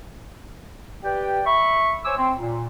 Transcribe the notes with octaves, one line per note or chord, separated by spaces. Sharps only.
G4 B4 D5 G5
E5 B5 C#6
C5 C#5 G#5 D6 E6
C4
A#2